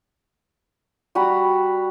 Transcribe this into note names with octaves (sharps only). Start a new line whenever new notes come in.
G3 F#4 A#5 B5